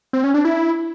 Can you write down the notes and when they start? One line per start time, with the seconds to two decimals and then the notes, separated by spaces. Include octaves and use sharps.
0.13 C4
0.24 C#4
0.34 D4
0.45 E4